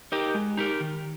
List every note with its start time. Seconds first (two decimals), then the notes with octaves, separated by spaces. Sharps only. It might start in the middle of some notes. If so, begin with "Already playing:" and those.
0.12 D#4 G4 A#4
0.34 G#3
0.57 D#4 G4 A#4
0.80 D#3